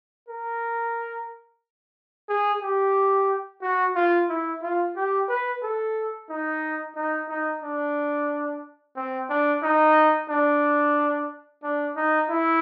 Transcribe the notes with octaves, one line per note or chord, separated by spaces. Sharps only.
A#4
G#4
G4
F#4
F4
E4
F4
G4
B4
A4
D#4
D#4
D#4
D4
C4
D4
D#4
D4
D4
D#4
E4